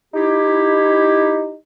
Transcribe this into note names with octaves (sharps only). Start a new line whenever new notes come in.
D#4 E4 G4